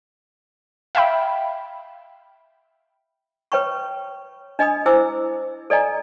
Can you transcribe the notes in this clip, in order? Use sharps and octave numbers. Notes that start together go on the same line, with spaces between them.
E5 F5 G5 B5
B4 C#5 G5 B5 C#6
D4 D#5 G#5 B5 D#6
E4 C5 G#5 D6 E6
A4 D5 D#5 G#5 A#5